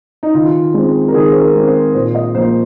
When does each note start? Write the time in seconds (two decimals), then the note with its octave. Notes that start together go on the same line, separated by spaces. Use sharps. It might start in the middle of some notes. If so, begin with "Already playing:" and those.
0.23 D#4
0.34 D#3 F4
0.74 G#3 C4
1.08 A#4
1.14 D#3 G#4
1.32 C5
1.41 A#4
1.55 G#3 C4
1.68 C5
1.94 A#2 C5
2.15 D#5
2.35 F3 A#3 C5